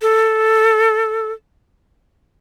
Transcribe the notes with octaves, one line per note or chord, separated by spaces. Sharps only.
A4